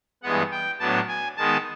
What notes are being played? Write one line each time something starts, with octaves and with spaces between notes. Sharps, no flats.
G2 E3 G#3 B3 F#5
G5
A2 F#3 B3 D4 A5
G#5
D#3 G#3 B3 D#4 A5